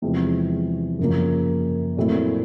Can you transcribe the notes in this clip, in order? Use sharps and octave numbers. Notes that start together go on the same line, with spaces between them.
E2 C3 F3 G#3 C4
F#2 C#3 F3 A#3
A#2 F#3 A3 C4 E4